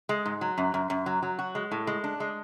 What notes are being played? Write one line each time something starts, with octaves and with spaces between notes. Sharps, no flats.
G#3
G#2
F#3
F#2
F#2
F#2
F#3
F#3
F#4
G#3
A2
G#3
D4
G#3